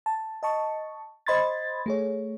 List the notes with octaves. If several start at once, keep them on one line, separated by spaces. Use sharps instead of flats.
A5
D#5 A5 C#6
C5 D#5 B5 C6 G#6 A6
A3 G#4 C#5